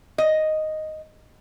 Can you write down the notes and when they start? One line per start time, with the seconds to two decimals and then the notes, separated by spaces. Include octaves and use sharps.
0.18 D#5